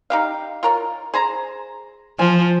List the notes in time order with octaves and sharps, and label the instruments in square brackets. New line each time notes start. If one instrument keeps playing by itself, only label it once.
[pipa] D#4 G4 F5
F4 A#4 C#5
G#4 C5 A#5
[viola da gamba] F3 [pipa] G#5